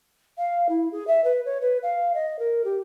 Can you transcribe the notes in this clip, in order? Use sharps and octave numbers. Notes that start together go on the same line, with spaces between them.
F5
E4
G#4
E5
B4
C#5
B4
F5
D#5
A#4
G4